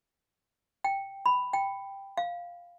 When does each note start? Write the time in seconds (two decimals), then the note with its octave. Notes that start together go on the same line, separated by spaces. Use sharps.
0.84 G5
1.26 B5
1.53 G5
2.17 F5